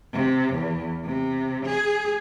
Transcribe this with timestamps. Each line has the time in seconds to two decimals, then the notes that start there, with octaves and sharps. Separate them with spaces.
0.13 C3
0.53 E2
1.05 C3
1.66 G#4